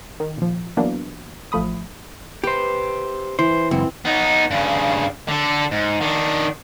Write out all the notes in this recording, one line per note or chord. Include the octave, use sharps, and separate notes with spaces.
D#3
A#2 F3
E3 F#3 A#3 B3 D4
A1 F3 A3 B5 D#6
G4 B4 C5
E3 C5
C#2 F#2 C4
B3 D#4
G2 C#3
D3 A4
G#2
D#3 D4